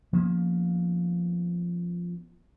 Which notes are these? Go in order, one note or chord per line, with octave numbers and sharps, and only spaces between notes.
F3 A#3 B3 C#4